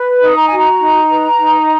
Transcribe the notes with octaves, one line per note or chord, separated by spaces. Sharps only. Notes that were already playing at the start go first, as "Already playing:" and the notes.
Already playing: B4
D#4
A#5
F#4 G#5
A#5
D#4
B4
D#4